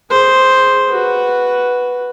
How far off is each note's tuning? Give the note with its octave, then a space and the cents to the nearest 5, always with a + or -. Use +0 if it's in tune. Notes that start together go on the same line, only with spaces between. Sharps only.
G#4 +0 C5 +0
F#4 +0 B4 +0